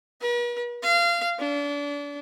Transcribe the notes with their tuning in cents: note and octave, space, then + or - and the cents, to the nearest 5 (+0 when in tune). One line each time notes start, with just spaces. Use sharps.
B4 -45
F5 -20
D4 -35